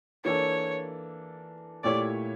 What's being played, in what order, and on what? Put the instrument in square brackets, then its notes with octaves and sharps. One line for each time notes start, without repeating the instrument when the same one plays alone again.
[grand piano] E3 A#3 D4 A4 [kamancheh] C#5
[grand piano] A#2 A3 E4 G4 C#5 [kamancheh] D5